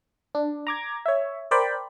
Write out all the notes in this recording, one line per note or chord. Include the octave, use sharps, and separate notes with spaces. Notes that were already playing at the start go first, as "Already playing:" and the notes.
D4
A#5 D6 G#6
C#5 E5
A#4 C5 D5 G5 B5